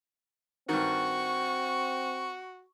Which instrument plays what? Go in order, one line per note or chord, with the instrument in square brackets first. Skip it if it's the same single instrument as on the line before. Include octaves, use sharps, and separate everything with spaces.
[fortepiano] G2 D#3 [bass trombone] C4 [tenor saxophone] F#4 [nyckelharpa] C#6